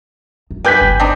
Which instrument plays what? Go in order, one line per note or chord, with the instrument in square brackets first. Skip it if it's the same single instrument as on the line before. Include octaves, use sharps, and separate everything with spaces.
[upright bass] F#2
[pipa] G4 B4 [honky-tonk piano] G#5 G6 B6
[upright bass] G1 C#2
[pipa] C4 D4 D#4